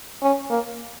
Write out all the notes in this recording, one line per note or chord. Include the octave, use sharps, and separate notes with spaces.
C#4
A#3